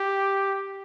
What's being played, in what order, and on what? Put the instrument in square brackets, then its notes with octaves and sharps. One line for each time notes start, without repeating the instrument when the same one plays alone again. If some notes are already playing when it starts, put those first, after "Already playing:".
Already playing: [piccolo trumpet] G4